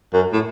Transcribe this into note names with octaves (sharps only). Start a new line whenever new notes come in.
F#2
A2